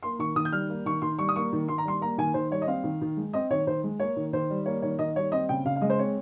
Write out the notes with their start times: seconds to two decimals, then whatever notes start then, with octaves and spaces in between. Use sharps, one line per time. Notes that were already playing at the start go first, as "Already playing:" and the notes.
0.03 A#3 C6
0.19 D#3 C#6
0.36 D#3 D#6
0.45 G6
0.52 G3 F6
0.70 A#3
0.86 D#3 C#6
1.02 D#3 C6
1.18 G3 C#6
1.29 D#6
1.36 A#3 C#6
1.53 D#3
1.68 D#3 C6
1.78 A#5
1.85 G3 C6
2.01 A#3 A#5
2.18 D#3 G#5
2.34 D#3 C5
2.51 G3 C#5
2.62 D#5
2.67 C4 F5
2.84 D#3
3.01 D#3
3.17 G#3
3.33 C4 D#5
3.51 D#3 C#5
3.67 D#3 C5
3.84 G#3
4.00 A#3 C#5
4.16 D#3
4.33 D#3 C5
4.50 G3
4.66 A#3 C#5
4.82 D#3 C#5
4.99 D#3 D#5
5.15 G3 C#5
5.32 C4 D#5
5.49 C#3 G5
5.65 C#3 F5
5.76 F5
5.81 G#3 D#5
5.90 C5
5.98 C4 C#5